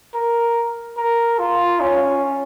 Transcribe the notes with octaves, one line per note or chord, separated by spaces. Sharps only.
A#4
A#4
F4
C#4